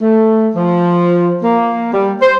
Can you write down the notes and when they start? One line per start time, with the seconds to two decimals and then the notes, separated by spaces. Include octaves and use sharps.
0.01 A3
0.55 F3
1.43 A#3
1.93 G3
2.21 C5